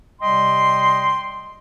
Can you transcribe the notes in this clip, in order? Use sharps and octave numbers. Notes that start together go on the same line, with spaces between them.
C3 G3 D#5 G5 C6